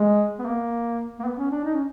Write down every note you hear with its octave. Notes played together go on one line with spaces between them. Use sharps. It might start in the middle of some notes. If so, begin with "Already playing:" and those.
Already playing: G#3
B3
A#3
A#3
B3
C#4
D4
D#4
C#4